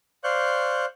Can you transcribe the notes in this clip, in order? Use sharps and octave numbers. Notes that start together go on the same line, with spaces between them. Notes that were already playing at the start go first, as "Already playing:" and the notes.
C5 D5 F5 C#6 F#6 G6